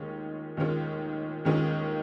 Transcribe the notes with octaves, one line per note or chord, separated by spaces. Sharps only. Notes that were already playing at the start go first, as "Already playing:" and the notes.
Already playing: D#2 D#3 G#3 C#4 F4
D#2 D#3 G#3 C#4 F4
D#2 D#3 G#3 C#4 F4